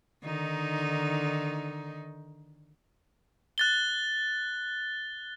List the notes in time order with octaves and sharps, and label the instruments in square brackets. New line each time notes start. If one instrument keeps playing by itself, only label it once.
[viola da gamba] D3 D#3 D#4
[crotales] F#6 A6 G7